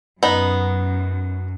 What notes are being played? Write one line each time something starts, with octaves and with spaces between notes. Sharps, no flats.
F#2 B3 D#4